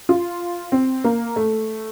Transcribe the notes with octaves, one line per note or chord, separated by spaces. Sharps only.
F4
C4
A#3
A3